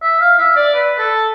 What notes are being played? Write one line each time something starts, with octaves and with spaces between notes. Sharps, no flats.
E5
F5
E5
D5
B4
A4